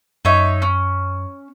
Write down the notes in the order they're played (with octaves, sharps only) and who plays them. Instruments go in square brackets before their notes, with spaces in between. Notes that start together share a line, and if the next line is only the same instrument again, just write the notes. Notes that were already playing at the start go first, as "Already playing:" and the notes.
[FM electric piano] F#2 [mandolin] D#4 C#5 E5
[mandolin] C#4